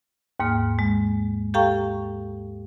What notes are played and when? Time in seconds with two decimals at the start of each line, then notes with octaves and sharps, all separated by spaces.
0.40 D#2 G#2 A#3 F6
0.79 G#3
1.54 G4 A4 F5 G5 A#5 C#6